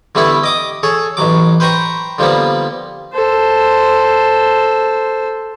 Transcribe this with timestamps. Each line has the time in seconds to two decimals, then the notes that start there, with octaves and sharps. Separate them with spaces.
0.15 D3 G3 A3 B3 E4
0.43 D#5 D6 D#6
0.83 G#4 A4 C#5
1.17 A1 B2 F#3 D6
1.60 B4 C5 G5 A#5 C#6
2.18 D3 F3 G3 A#3 B3
3.13 A4 C5